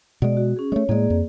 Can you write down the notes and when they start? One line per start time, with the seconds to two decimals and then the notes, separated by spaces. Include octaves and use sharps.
0.22 B2 G#3 D5
0.37 F#4
0.56 C#4 G#4
0.72 G#3 A3 C#5
0.89 A2 G#3 A#3 G#4 D5
1.10 F2